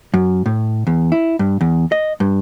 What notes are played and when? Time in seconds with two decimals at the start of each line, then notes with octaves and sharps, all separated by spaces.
0.14 F#2
0.46 A2
0.87 E2
1.12 E4
1.39 G2
1.61 E2
1.92 D#5
2.20 G2